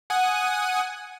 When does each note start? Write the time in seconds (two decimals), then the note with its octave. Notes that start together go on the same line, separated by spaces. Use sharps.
0.10 F#5 G#5 D#6